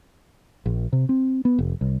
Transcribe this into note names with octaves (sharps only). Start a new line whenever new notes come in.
A#1
C3
C4
B3
F1
C2